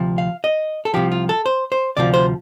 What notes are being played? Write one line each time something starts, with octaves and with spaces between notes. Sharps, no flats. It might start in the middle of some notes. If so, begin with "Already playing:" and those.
Already playing: D2 C3 F3
F5
D#5
A4
C2 C3 F3 G4
F4
A4
C5
C5
D2 C3 F3 D5
C5